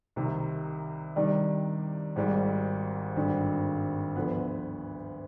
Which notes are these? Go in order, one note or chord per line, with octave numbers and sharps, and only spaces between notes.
C2 C3 D#3
C3 D#3 G3 D4
G#1 G#2 G3
G#1 G2 D3
D2 D3 F3 B3